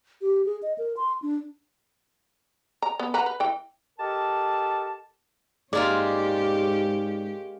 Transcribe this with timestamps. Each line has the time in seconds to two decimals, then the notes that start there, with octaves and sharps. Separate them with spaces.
0.21 G4
0.45 G#4
0.63 D#5
0.78 A#4
0.97 C6
1.22 D4
2.82 A#5
2.99 B3
3.14 B4 F#5 A#5
3.26 B4
3.40 E3 G5
3.98 G4 A4 A#4 D#5 A5
5.73 G#2 G#3 A#3 C#4 F4 G4 D5